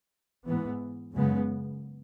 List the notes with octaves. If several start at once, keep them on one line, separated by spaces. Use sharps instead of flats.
G#2 E3 B3
F#2 C#3 G#3 B3